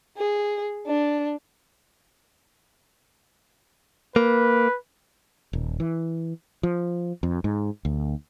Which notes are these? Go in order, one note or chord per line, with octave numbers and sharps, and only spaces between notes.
G#4
D4
A#3 B4
D#1
E3
F3
F2
G#2
D2